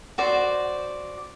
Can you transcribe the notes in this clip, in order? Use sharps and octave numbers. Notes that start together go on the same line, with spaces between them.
F#4 C5 D5